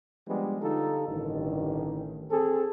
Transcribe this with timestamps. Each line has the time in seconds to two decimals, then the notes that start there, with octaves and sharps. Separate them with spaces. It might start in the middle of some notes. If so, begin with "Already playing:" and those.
0.27 F3 G3 G#3 B3 D4
0.61 D3 D#4 F4 G4 A4
1.08 A1 G2 D3 D#3
2.31 C4 G#4 A4